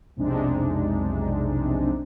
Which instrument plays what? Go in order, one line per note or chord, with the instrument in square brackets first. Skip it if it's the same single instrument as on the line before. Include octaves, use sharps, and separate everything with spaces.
[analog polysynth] B1 F2 C3 G#3 D4 D#4